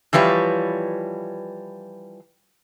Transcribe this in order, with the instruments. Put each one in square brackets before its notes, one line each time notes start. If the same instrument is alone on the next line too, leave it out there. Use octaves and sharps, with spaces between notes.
[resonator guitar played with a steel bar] E3 F3 G3 B4 C#5